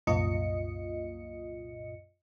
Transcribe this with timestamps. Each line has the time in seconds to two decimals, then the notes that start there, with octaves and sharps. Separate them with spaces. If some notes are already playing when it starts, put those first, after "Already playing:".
0.07 C2 F#2 A#2 F4 D#5 C#7